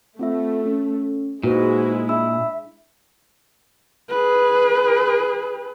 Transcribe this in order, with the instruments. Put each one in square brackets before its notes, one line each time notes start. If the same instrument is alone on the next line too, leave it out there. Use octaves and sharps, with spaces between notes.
[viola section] A3 [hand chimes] C4 F4 E5
[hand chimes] C#4
[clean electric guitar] A#2 [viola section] G#3 E4 [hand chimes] D#4 B4 C5 [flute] F#4
[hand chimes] D4 B5 E6 [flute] E5
[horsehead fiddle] G#4 B4